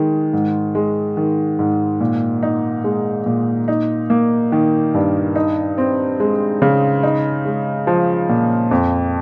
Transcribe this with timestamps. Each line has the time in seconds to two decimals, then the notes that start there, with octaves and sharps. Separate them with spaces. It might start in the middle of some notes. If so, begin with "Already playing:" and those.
Already playing: D#3 G#3
0.33 G#2
0.75 G#3
1.17 D#3
1.59 G#2
2.01 A#2
2.43 D#4
2.84 G#3
3.26 A#2
3.68 D#4
4.10 A#3
4.52 D#3
4.94 G2
5.36 D#4
5.78 C4
6.20 G#3
6.62 C#3
7.03 D#4
7.45 G#3
7.87 F3
8.29 A#2
8.71 F2